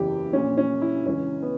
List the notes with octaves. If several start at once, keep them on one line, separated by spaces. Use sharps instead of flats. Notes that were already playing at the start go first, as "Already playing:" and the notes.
Already playing: F#1 E2 C#3 E3 G4
A#1 A#2 C#4
C#4
E4
C#2 C#3 E3 C#4
B3